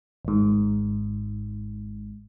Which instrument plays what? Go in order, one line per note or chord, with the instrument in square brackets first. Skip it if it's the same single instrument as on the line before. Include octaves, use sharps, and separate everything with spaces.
[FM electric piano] G#1 G#2